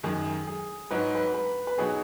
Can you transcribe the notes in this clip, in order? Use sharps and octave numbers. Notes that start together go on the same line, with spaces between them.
F#2 D#3 G#3 G#4
G#4
G#2 F#3 D#4 F#4 B4
B4
B4
B4
B2 F#3 D#4 F#4 G#4